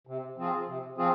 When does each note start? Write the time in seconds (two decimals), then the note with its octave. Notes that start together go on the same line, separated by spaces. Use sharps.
0.07 C3
0.37 F3 C4 F4 G#4
0.68 C3
0.98 F3 C4 F4 G#4